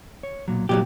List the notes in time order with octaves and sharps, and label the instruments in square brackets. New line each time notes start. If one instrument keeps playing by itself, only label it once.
[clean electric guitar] C#5
B1 A#2 F#3
[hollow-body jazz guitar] C2 F#3 G4 [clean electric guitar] A#2 G3